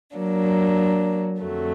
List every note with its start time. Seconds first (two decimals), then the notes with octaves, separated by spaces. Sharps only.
0.17 F#3 A#3 D4
1.42 F2 D3 F#3 A3